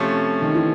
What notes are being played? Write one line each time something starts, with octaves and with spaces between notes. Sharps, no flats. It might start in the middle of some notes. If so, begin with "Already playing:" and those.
Already playing: C3 F3 A3 C#4
D#3
E3